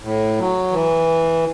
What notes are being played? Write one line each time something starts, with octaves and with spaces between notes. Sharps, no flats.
A2
F#3
E3